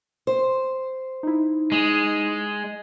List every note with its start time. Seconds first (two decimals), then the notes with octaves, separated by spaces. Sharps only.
0.27 C5
1.23 D#4 E4
1.72 G#3